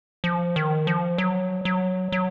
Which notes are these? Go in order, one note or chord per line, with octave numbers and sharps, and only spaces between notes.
F3
D#3
F3
F#3
F#3
F#3